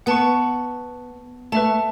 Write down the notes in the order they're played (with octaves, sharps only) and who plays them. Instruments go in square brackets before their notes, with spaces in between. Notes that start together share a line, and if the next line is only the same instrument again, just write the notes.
[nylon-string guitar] B3 [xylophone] F#5 A5 C#6
[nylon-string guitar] A3 [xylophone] B4 E5 A5